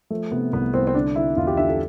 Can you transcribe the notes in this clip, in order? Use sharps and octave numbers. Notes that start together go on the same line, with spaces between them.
F3 A3
C3 B3
C2 B3
C2 C4
C4
D3 D4
D3 E4
E2 F4
G4
D3 E5
A4